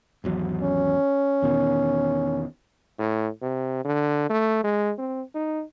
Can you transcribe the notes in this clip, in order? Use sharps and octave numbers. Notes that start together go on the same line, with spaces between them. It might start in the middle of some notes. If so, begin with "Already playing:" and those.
G#1 E2 F#3
C#4
E2 B2 D#3
A2
C3
D3
A3
G#3
C4
D#4